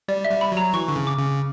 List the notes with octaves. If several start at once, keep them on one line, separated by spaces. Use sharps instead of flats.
G3 D5
E5
G3
B5
F#3
A#5
E3 C#6
D3
C#3
D6
C#3